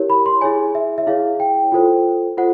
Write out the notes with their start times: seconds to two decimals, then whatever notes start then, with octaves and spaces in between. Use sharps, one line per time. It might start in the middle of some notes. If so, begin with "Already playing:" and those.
Already playing: E4 G4 A#4 C#5
0.10 B5
0.26 C6
0.41 E4 G#4 C#5 G#5
0.75 E5
0.98 E5
1.07 E4 G#4 C#5 F5
1.40 G5
1.72 F4 A4 C5
2.37 F4 A4 C5 F#5